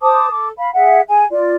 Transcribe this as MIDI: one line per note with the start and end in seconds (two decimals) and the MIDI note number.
0.01 0.29 72
0.01 0.29 81
0.01 0.29 86
0.01 0.29 87
0.30 0.49 69
0.30 0.49 86
0.57 0.71 77
0.57 0.71 83
0.74 1.01 68
0.74 1.01 76
0.74 1.01 78
1.09 1.24 68
1.09 1.24 80
1.30 1.55 65
1.30 1.55 74